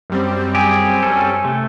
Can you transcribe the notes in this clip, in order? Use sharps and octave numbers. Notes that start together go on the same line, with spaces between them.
F#2 G3 C4
G4 G#4 G#5
C#4 A4
C3 A3